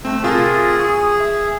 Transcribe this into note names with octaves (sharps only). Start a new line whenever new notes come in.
A3 C4 E6
C3 F4 G#4 A#4
C#6 D#6
E5